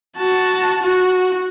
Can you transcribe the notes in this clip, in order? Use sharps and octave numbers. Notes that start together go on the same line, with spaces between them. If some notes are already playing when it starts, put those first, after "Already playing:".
F#4 A5
F#4